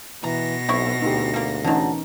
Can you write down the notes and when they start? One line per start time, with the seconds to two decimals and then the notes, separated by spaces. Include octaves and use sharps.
0.24 B2 E3 A#5 A#6
0.69 B1 C4 E4 C#6
1.02 D2 D#4 G4
1.34 G3 A#3
1.64 D3 E3 F#3 C#4 D#4